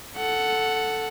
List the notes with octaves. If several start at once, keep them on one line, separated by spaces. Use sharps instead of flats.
A4 F#5